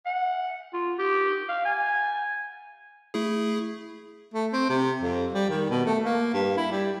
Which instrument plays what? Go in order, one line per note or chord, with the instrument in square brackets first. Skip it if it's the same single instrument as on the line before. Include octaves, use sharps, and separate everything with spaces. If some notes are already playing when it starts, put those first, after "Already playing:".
[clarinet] F#5
F4
G4
F5
G#5
[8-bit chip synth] A3 E4 G#4
[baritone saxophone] A3
C4
C3
F2
G3
D#3
B2
A3
A#3
G2
E4
G3